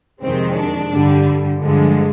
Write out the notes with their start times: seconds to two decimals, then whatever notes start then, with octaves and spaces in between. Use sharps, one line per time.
0.23 F2 C3 D#3 G#3 C4
0.57 D4
0.91 G2 D3 G3
1.60 G2 D3 F3 G#3